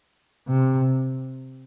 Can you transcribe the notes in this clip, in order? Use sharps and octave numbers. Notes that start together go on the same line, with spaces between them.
C3